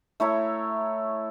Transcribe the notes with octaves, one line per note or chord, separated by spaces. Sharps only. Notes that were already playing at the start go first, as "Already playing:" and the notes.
A3 E4 C#5 A#5